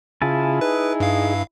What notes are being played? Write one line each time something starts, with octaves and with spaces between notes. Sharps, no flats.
C#3 E4 F4 G#4 G#5 A5
D#4 G#4 B4
G2 F5